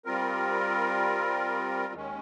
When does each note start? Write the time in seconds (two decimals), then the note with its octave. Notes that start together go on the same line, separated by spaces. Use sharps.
0.05 G3 C4 F4 A#4
1.93 D#2 D#3 G#3 C#4